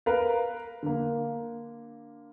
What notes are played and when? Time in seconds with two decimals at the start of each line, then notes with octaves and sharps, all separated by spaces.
0.06 A#4 B4 F5
0.83 D3 A#3